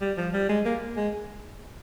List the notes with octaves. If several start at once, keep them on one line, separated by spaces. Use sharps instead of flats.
G3
F3
G3
G#3
A#3
G#3